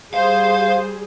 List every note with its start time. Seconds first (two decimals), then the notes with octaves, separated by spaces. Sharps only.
0.14 G3 G#4 C5 F5